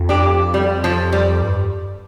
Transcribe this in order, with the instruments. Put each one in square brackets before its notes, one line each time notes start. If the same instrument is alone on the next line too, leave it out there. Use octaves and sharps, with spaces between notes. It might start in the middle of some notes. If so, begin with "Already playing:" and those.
Already playing: [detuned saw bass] F2
[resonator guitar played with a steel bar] D4 G4
G3
F3
G3
[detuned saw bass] G2